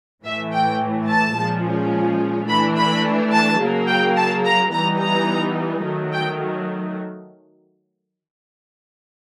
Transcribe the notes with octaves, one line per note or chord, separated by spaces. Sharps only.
A2 E3 A3 E5
G5
A5
A#2 F3 G#3 C#4
E3 A3 D4 B5
B5
A5
C#3 F#3 A#3
G5
A5
A#5
E3 G3 B3 D#4 A#5
A#5
D#3 F#3 A3
G5